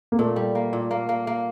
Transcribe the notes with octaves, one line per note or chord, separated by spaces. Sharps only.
A#3
A#2 A3
G3
A#3
A#2
A#3
A#3
A#3